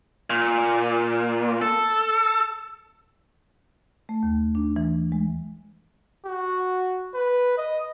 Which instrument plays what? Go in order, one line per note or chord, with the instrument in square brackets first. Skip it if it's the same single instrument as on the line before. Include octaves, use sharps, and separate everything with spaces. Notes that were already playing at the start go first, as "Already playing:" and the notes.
[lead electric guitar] A#2
A4
[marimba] A3
D#2
D4
E3
G#3
[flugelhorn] F#4
B4
D#5